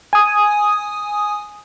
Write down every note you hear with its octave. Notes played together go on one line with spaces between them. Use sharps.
G#5 D#6